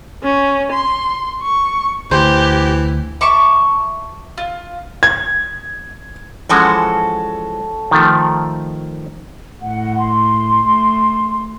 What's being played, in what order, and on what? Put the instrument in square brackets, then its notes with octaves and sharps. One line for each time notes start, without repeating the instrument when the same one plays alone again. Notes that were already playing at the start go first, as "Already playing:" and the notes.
[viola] C#4
C6
C#6
[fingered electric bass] D2 [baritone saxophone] E3 [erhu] G4 [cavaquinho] C5
[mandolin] E5 A5 C#6 D6
F4
[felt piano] G#6
[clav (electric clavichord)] E3 F3 G#3 [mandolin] C#4 F#4 A4
[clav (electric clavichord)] D#3 F3 A3
[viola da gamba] A2 [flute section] F#5
[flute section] C6
[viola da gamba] A3